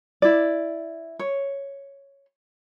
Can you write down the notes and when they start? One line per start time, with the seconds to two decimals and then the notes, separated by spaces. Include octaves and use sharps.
0.22 E4 D5
1.19 C#5